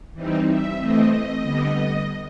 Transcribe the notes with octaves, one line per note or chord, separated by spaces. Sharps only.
E3 G3 C4 D#4
E5
E3 A3 C4 D#5
D#5
D3 G3 B3